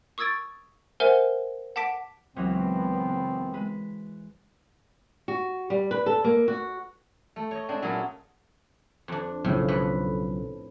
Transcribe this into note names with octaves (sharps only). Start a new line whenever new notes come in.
C#6 D#6 E6 G#6 A6 D7
A#4 C5 E5 F#5 G#5 F6
F#5 A5 D6 B6 D7
C#2 F#2 E3 F#3 B3 C4
G#3 B4
F#4
G3
B4
A4
A#3
F#4
A3
C#5 D#5
G#3 C4 D4 C5
A#2 F#3 C#4 E4 G#4 A4
F2 D4
B1 A2 C#3 F3
F2 A2 B4